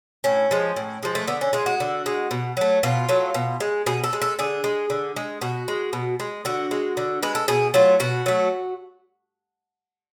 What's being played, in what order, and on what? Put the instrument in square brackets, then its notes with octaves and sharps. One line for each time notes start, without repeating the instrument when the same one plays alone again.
[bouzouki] A2 C#4
F3 G#3
A2
F3 G#3
A3
D3 B3
C#4
G#3 F4
F#4
D3
G#3
B2
F#3 A3
B2 F4
F#3 A3
B2
G#3
B2 G#4
A4
G#3
A4
D3 G#4
G#3
D3
G#3
B2 F#4
G#3
B2
G#3
D3 F#4
G#3
D3
G#3 B4
A4
B2 G#4
F#3 A3 F4
B2 F#4
F#3 A3